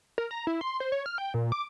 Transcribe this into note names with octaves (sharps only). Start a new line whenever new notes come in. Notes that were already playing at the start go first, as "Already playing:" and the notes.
A#4
A#5
E4
C6
C5
C#5
F6
G5
A#2
D6